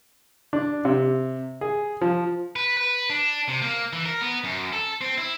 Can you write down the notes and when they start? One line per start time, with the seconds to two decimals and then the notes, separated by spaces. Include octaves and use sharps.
0.53 D4
0.85 C3
1.61 G#4
2.01 F3
2.56 B4
2.77 B4
3.10 D4
3.48 C3
3.62 A#3
3.93 E3
4.06 A#4
4.21 B3
4.44 F#2
4.73 A4
5.01 C4
5.18 E4